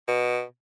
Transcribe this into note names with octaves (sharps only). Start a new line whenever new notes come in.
B2